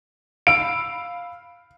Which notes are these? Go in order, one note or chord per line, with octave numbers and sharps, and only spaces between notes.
F5 B5 E6 D7